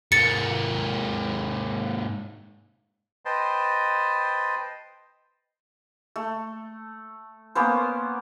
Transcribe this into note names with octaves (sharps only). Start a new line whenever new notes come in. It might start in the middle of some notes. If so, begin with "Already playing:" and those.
G#2 A#3 A6 C#7
B4 C5 D#5 G5 A5 C6
A3
A#3 B3 C#4 C5